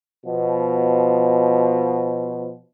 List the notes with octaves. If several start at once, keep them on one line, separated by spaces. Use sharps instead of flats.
B2 F3